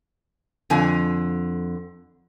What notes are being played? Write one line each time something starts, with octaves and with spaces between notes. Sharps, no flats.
F2 D3 G#5